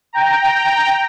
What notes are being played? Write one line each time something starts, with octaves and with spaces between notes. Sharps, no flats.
G5 A#5